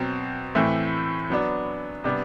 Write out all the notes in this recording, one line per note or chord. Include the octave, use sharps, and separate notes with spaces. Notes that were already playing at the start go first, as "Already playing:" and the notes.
Already playing: B2 F#3 C4
A2 E3 A3 C4 E4
F#3 B3 D4
C3 G3 B3 D4